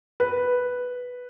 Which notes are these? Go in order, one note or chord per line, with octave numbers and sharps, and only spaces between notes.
B4